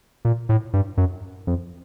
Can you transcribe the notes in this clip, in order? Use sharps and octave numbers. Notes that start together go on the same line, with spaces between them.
A#2
A2
G2
F#2
F2